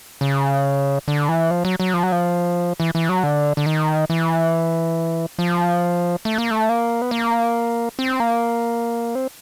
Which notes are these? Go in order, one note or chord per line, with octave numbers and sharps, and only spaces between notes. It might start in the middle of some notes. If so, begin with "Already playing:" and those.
C#3
D3
E3
F3
F#3
F#3
F3
F#3
F3
E3
E3
F#3
D3
D3
D#3
E3
F3
A3
A#3
A3
A#3
B3
A#3
C4
A#3
C4